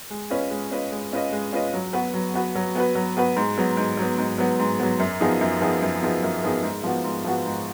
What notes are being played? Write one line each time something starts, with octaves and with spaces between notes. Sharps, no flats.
G#3
C#4 F4 B4 D#5
G#3
C#4 F4 B4 D#5
G#3
C#4 F4 B4 D#5
G#3
C#4 F4 B4 D#5
F#3
B3 F#4 B4
F#3
B3 F#4 B4
F#3
B3 F#4 B4
F#3
B3 F#4 B4
G#2
F#3 B3
G#2
F#3 B3
G#2
F#3 B3
G#2
F#3 B3
F#2
F3 B3 D#4 G#4
F#2
F3 B3 D#4 G#4
F#2
F3 B3 D#4 G#4
F#2
F3 B3 D#4 G#4
G#2
F3 B3 F#4
G#2
F3 B3 F#4
G#2